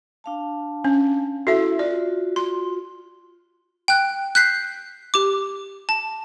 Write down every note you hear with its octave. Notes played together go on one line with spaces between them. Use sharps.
D4 F5 A5
C#4
E4 F#4 A4 E5
F4 F#4 D5
C6
G5 F#6
F#6 G6 B6 C7
G4 D6
A5